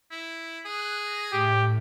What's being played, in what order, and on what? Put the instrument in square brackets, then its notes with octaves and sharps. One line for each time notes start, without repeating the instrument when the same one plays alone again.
[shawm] E4
[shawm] G#4 [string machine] F#6
[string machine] A#6
[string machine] A2 [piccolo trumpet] G4